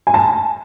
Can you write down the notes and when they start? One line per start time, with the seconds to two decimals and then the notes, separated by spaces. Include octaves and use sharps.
0.07 G#5
0.14 A5